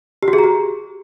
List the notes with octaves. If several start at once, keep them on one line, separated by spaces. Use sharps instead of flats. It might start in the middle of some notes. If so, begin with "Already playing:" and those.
G4
F#4
G#4
A#5
G4